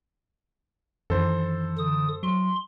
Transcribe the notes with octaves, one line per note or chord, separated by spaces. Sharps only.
F#2 D#3 E3 A4 C5
D3 D#6
F#3 C6